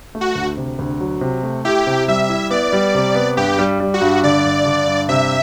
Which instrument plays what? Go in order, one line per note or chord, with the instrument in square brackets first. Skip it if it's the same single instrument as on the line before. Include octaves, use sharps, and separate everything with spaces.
[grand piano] A3
[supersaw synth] F#4
[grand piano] D2
C3
D2
F#3
C3
A3
[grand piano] E4 [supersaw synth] G4
[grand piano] C3
[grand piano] G3 [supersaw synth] E5
[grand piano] E4
[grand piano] B3 [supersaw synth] D5
[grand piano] G3
C3
B3
[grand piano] G2 [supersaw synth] G4
[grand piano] G3
G3
[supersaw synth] F#4
[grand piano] G2
[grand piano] D3 [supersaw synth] D5
[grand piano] G2
D3
G2
[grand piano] C3 [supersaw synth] E5